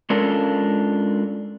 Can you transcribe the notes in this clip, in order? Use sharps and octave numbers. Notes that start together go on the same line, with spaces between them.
G#3 C#4 D4 F4 A4 A#4